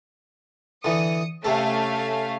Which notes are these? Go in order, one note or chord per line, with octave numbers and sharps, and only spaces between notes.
D3 E3 D#6 C#7
C3 A3 C#4 A4 F5